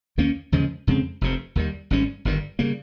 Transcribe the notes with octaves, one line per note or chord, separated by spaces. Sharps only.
D#2 D#3 A#3 C#4
D#2 C#3 F3 G#3
F2 C#3 G#3 C4
F1 F2 C3
D#2 D#3 G3
G#1 G#2 G3 C#4
G1 G2 D#3 G3
C#3 G3 A#3